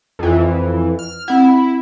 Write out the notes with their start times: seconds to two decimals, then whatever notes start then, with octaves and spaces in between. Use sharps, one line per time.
0.19 F2 E3
0.99 F6
1.28 C4 E4 F#5